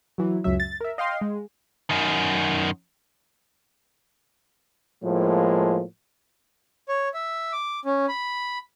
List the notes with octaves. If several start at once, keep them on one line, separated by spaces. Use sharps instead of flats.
E3 F#3
C#2 F#2 F#3 E5
A6
A#4 E5
D#5 F5 G5 C6
G#3
F#2 D#3
A2 F3 G#3 A#3
C#5
E5
D6
C#4
B5